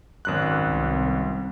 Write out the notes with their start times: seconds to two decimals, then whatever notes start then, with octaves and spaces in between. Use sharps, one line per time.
0.25 G#1 F#2 F#6
0.59 C2